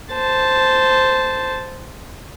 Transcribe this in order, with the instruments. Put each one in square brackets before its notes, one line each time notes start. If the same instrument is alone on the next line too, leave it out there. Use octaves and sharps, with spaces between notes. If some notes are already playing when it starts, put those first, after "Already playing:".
[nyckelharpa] C5 A5